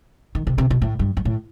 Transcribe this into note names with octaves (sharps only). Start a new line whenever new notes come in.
D#3
C3
C3
B2
A2
G2
G2
A2